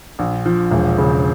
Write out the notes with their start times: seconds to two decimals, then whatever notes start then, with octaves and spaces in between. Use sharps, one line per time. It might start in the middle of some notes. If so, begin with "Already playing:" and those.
0.19 A#1
0.46 F3
0.71 E1
0.98 C#3